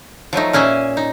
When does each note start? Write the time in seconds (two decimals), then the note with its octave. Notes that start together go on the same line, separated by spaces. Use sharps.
0.33 F3 F#3 A3 D#4
0.53 A#2 C#4 G#4 E5 G#5
0.97 D#4